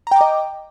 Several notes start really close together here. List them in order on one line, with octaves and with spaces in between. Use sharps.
A#5 G5 D6 D#5